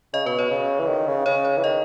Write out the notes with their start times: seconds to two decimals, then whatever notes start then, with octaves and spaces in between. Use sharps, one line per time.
0.13 C#3 D#5
0.26 B2 B4
0.39 B2 C#5
0.51 C#3
0.79 E3
0.88 D#3
1.07 C#3
1.26 C#3 C#5
1.45 C#5
1.57 E3
1.64 D#3 D#5